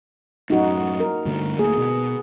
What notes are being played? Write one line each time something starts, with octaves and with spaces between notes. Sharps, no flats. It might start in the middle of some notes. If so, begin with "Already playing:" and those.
F#2 A2 D#4 F#4
A#4
G2 D3 A3
D1 A3 A#3 G#4
B2